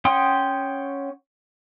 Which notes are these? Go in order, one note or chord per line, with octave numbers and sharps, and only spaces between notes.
C#4 F#5 G5 C6 D#6